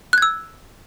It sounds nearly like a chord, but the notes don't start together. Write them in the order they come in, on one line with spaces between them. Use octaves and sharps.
F#6 G#6 E6